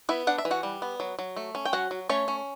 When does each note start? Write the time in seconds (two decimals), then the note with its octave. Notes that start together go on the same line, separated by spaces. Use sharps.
0.09 B3 E4 E5
0.27 D4 F#5
0.38 E5
0.45 E3
0.51 F#4 F#5
0.63 G3
0.82 B3
1.00 F#3
1.19 F#3
1.36 A3
1.55 C#4
1.65 G5
1.73 F#3 F#4 F#5
1.91 F#3
2.09 A3 C#4 C#5
2.28 C#4